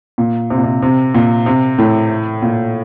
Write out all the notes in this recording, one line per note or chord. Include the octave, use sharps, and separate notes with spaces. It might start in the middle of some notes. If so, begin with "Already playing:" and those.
A#2
C3
A#2
C3
C3
A#2
C3
A2
A#2